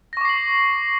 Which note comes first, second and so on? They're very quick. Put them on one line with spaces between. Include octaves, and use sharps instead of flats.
A#6 C#6 D6 C7 F#7